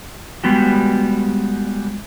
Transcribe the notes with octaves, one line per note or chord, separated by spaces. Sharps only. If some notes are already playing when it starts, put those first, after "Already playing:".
G3 G#3 B3 F#4 G4